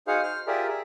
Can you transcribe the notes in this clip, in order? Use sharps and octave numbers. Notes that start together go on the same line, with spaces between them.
D#4 F#4 G#4 C5 F5
C5 F6
F4 G4 G#4 A#4 D5 E5
G#4 E5